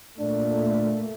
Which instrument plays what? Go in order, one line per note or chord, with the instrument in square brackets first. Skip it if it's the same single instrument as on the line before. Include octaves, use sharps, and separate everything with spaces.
[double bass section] A#2 A3 [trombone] D4